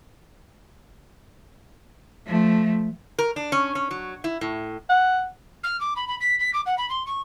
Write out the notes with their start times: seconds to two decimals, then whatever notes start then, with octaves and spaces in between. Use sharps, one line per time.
2.26 F3 A3
3.18 A#4
3.36 D4
3.52 C#4
3.75 C#4
3.91 F#3
4.24 E4
4.41 A2
4.90 F#5
5.63 F6
5.80 D6
5.96 B5
6.07 B5
6.20 B6
6.39 B6
6.53 D6
6.66 F#5
6.77 B5
6.89 C6
7.06 C#6